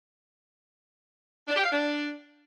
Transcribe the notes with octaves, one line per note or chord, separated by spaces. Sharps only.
D4
G4
F5
D4